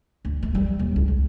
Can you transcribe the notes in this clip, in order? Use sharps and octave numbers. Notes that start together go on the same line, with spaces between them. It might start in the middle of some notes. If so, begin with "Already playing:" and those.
D2
A3
G3
D#2
C#2
C#2